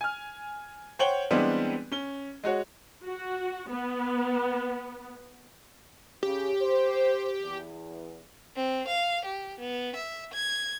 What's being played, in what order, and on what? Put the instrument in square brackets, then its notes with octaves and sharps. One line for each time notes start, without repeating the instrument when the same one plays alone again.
[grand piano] G#5 F6
C5 C#5 F#5 G5 F#7 G7
E3 G3 G#3 B3 C4 D4
C#4 G7
G#3 F#4 C#5 F#5
[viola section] F#4
B3
[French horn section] C#3 [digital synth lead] G4
[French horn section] C5
E2
[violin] C4
F5
G4
B3
E5
G#6